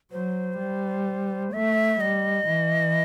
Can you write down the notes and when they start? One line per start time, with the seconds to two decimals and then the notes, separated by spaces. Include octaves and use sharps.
0.12 F#3 C5
0.59 G3
1.53 A3 E5
2.00 G3 D#5
2.47 E3